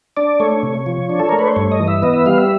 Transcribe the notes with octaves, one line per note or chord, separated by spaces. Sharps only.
D4 D5
A3 C#5
C3
F3
D4
A4
A3 A#4
B4
C5
G2 C#5
D#5
E3
E5
B3 D#5
E5
G3 F5
E5